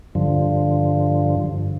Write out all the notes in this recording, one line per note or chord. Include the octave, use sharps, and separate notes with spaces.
G2 D3 F3